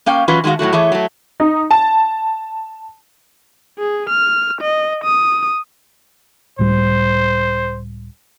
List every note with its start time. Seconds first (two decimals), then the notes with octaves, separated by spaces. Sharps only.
0.06 A#3 C#4 F5 G5
0.28 E3 F#3 C#4 F4 B4
0.44 D#3 G#3 A3 F#4 F5
0.59 A2 F#3 A3 F#4
0.72 E3 A3 G#4 C#5 E5
0.92 F#3 A3
1.40 D#4
1.71 A5
3.78 G#4
4.10 F6
4.61 D#5
5.04 D#6
6.59 C#2 A2 G3 C5